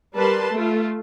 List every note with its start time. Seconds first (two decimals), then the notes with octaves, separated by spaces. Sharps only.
0.16 G3 A#4 B4 A5 C6
0.55 A3 F4